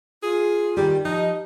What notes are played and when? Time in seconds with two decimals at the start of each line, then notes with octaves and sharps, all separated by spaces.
0.23 F4 G#4
0.77 D#3 G3 G4
1.05 F3 D#4 D#5